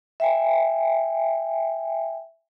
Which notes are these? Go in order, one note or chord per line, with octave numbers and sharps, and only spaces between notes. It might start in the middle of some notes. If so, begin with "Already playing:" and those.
E5 G5 G#5